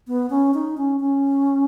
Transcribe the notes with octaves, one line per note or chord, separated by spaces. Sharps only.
B3
C#4
D#4
C#4
C#4